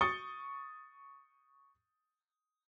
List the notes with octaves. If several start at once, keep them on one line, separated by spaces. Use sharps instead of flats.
C#6 D#6 A6 C#7 G7